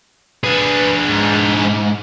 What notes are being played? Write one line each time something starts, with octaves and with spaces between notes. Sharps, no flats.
D4 G#4 B4
G#2